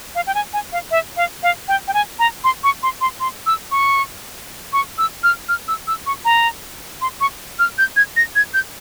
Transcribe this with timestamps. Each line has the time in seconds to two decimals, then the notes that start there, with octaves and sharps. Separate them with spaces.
0.15 F5
0.27 G5
0.35 G#5
0.53 G#5
0.72 F5
0.91 E5
1.17 F5
1.43 F5
1.68 G5
1.88 G5
1.94 G#5
2.19 A#5
2.44 C6
2.64 C#6
2.83 C6
3.01 C6
3.20 C6
3.46 E6
3.71 C#6
4.73 C#6
4.98 E6
5.23 F6
5.49 F6
5.68 E6
5.87 E6
6.06 C#6
6.25 A#5
7.01 C6
7.21 C#6
7.59 F6
7.78 G6
7.96 G#6
8.16 A#6
8.36 G#6
8.54 G6